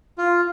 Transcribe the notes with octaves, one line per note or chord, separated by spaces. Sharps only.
F4